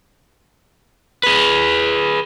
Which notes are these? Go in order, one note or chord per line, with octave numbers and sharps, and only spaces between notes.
G#4 B4